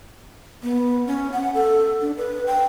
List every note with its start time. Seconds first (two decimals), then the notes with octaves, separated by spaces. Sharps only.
0.63 B3
1.07 C#4
1.32 F#5
1.55 A4
2.01 D4
2.18 B4
2.46 G5